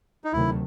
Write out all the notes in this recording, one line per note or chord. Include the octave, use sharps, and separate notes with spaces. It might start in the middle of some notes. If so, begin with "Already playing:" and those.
D#4
D2 C3 D#3 F#3 A3 E4